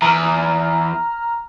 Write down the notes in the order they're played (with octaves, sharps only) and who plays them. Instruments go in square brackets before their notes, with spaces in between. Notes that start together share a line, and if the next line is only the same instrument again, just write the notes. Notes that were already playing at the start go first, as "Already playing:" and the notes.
[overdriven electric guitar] E2 [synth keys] A#5 F6